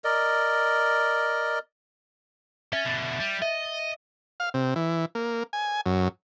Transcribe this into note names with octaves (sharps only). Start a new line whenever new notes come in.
A#4 D5 D#5
C#4 E5 A6
B2 D3
G3
D#5 E5
F5
C3
E3
A#3
G#5
F#2